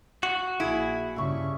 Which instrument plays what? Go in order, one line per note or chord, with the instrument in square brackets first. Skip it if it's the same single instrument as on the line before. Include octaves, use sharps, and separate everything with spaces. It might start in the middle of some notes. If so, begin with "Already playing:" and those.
[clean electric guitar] F#4
[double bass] A#1 [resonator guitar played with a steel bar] E4 [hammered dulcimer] G#4
[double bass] G2 C#3 [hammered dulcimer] E5 C#6